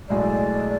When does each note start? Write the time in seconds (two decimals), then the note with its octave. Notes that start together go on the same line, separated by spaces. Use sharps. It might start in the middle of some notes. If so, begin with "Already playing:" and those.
0.09 B1 A2 G#3 D5